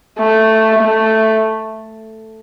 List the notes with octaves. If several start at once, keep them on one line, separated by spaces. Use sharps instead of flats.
A3
A3